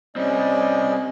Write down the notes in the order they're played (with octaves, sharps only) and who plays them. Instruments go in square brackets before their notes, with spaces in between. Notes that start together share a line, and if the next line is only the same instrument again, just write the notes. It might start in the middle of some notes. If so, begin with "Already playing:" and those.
[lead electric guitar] G3 C4 [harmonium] C#4 D5 D#5